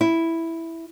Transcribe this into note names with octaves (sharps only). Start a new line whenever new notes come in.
E4